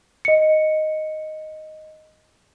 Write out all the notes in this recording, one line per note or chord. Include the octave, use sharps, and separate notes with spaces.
D#5 C#7